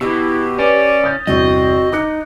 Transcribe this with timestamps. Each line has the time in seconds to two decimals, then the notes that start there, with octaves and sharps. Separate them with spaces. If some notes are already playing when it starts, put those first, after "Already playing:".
0.01 B2 E4 G4 E6
0.59 C#4 B4 D5
1.04 D#6 G6 A6
1.27 G1 E2 C3 C4 F#4 D#5
1.92 D#4 D6 F#6 C#7